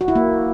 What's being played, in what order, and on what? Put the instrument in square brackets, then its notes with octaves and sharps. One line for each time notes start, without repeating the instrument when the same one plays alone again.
[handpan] F#4
E4
A#3